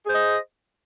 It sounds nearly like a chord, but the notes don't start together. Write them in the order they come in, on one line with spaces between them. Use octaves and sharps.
G#4 C5 D#5